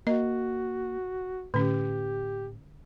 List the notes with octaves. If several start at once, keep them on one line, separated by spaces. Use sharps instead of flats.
A#3 F#4 D#5
A2 D3 C#4 G4